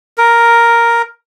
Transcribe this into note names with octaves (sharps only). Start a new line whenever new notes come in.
A#4